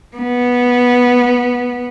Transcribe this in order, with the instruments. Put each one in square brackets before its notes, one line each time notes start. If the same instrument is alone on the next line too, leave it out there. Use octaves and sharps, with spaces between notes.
[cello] B3